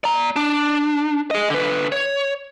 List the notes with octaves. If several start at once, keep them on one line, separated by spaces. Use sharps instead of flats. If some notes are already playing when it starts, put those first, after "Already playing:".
D5 A#5
D4
G#4 D#5
D3 B4
C#5